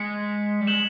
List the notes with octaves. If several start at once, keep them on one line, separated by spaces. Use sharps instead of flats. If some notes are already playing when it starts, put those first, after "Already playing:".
Already playing: G#3 B6 C#7
G3
G#3 E7 F#7